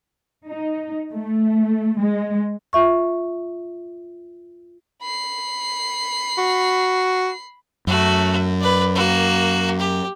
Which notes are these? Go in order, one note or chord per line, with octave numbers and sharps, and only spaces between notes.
D#4
A3
G#3
F4 E5 C#6
B5 C7
F#4
F#2 A3 F#4
B4 D5
A#3 F#4
G4